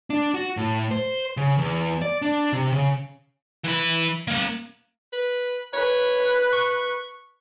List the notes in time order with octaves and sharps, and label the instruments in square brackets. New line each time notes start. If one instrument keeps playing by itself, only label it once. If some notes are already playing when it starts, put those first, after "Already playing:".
[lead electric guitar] D4
F#4
A2
C5
C#3
E2
D5
D4
C3
C#3
[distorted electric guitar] E3 B5
A#3 F#5
[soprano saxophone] B4
[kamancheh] B4 [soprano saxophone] C#5
[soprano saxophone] C#6